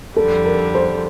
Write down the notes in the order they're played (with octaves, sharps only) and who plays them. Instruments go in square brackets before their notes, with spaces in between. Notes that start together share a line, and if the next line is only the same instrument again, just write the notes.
[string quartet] F2 D3 G3 [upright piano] A4
[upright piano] A#4
C5